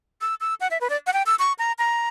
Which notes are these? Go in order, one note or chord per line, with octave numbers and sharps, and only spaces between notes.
E6
E6
F#5
E5
B4
D5
F#5
G5
E6
C#6
A#5
A#5